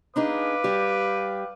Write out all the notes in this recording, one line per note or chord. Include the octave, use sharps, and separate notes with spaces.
D4 D#4 G#4 B4 F5 D6
G3 G4